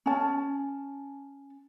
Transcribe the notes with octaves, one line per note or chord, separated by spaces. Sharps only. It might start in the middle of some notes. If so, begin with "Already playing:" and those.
C#4 A5